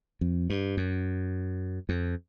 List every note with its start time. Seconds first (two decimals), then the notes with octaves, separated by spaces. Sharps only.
0.21 F2
0.50 G2
0.77 F#2
1.89 F2